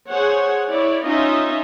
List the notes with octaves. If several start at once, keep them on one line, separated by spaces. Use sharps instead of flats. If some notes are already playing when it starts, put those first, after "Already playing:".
G#4 C5 C#5 F#5
E4 C#5 D5
C#4 D#4 F4 D#5 E5